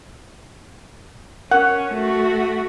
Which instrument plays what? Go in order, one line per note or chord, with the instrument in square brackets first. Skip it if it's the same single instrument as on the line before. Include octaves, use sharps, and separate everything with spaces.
[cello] C#4 [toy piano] A#4 [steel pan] F#5
[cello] A3 F#4